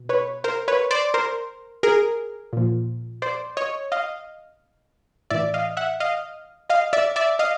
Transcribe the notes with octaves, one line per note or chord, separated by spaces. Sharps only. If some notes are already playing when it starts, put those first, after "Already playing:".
Already playing: B2
B4 C#5
A#4 C5
B4 C#5
C5 D5
A#4 C5
G#4 A#4
A#2 F3
C5 D5
C#5 D#5
D#5 F5
A2 E3 D5 E5
D#5 F5
E5 F#5
D#5 F5
D#5 F5
D5 E5
D5 E5
D#5 F5